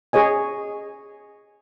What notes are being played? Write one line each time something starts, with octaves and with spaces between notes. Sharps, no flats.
G#4 C#5 D#5 G#5